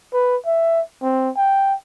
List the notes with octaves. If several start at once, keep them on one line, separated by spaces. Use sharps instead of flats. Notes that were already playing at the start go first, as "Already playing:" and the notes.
B4
E5
C4
G5